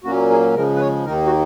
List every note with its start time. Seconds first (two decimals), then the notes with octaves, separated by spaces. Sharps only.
0.04 A#2 F#3 A#3 C#4 F#4
0.30 G#4
0.54 C#3 F3 G#3 A#4
0.76 B4
0.80 C#5
1.05 D#2 D#3 A#3 D#4 A#4
1.26 F#4